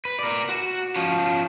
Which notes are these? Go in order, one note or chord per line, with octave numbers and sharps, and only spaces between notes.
B4
A#4 D5
F#4
F3 C#4